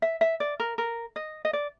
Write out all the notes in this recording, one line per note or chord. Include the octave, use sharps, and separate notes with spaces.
E5
E5
D5
A#4
A#4
D#5
D#5
D5